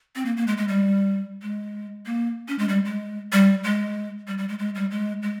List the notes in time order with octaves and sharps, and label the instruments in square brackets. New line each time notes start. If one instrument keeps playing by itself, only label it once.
[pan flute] C4
A#3
A#3
G#3
G#3
G3
G#3
A#3
C#4
G#3
G3
G#3
G3
G#3
G3
G3
G#3
G#3
G3
G#3
G#3